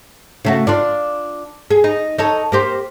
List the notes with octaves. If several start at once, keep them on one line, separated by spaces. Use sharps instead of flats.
C#3 A3 F#4
D4 F4 D5
G#4
D#4
D#4 A4 C#5
A#3 G4 C5